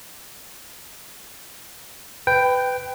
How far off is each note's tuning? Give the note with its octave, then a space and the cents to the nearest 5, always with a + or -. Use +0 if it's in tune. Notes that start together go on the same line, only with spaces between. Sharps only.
B4 +20 G5 +0